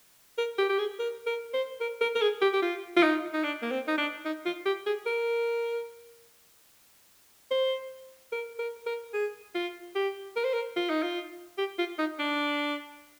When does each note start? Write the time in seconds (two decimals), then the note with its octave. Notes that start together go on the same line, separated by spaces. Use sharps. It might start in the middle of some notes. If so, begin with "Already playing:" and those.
0.38 A#4
0.58 G4
0.69 G4
0.79 G#4
0.99 A#4
1.26 A#4
1.54 C5
1.81 A#4
2.01 A#4
2.15 A#4
2.22 G#4
2.42 G4
2.53 G4
2.62 F4
2.97 F4
3.03 D#4
3.33 D#4
3.43 D4
3.62 A#3
3.71 C4
3.88 D#4
3.98 D4
4.25 D#4
4.45 F4
4.66 G4
4.86 G#4
5.06 A#4
7.51 C5
8.32 A#4
8.59 A#4
8.86 A#4
9.13 G#4
9.55 F4
9.95 G4
10.36 A#4
10.44 C5
10.53 A#4
10.77 F4
10.90 D#4
11.03 F4
11.58 G4
11.78 F4
11.99 D#4
12.19 D4